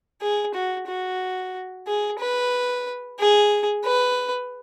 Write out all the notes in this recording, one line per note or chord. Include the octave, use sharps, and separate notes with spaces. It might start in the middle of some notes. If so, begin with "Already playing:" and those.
G#4
F#4
F#4
G#4
B4
G#4
B4